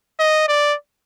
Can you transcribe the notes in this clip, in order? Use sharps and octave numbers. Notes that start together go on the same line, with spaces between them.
D#5
D5